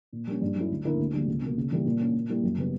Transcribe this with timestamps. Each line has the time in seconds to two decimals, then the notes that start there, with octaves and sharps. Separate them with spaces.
0.12 A#2
0.27 G3 A#3 C#4
0.41 G2
0.56 F#3 C#4 E4
0.70 D2
0.85 D3 A#3 E4 A#4
0.99 D2
1.13 D3 G3 A#3
1.27 C#2
1.42 B2 A#3
1.57 C#3
1.71 E3 G3 A#3 E4
1.86 A#2
2.00 A#3 C#4
2.14 A#2
2.29 G3 A#3 E4
2.43 F#2
2.57 C#3 G3 B3